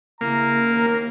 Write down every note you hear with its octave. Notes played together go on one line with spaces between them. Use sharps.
C#3 A#3 E4 A#5
D#2 A#4